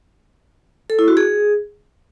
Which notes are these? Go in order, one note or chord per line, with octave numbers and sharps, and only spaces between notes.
A4
E4
F#4
G#4